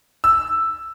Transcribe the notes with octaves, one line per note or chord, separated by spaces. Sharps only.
E6